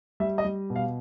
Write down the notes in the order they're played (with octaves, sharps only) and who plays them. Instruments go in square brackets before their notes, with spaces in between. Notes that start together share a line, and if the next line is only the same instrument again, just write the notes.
[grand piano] G3 E5
D#5
G3
B2
F5